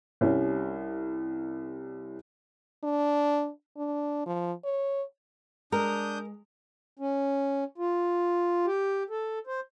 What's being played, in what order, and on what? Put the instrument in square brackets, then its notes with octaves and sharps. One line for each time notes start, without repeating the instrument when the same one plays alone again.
[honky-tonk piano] C2 G3 C#4
[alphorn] D4
D4
F3
C#5
[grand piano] G#3 [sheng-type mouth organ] D4 D#6 G6 [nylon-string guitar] A#4
[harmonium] C#4
F4
G4
A4
C5